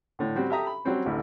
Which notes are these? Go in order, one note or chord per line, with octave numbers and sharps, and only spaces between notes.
A2 D3
G3 C4 F#4
G4 A4 E5 A#5 D#6
B5
F#3 G3 C4 C#4
A1 D2 E4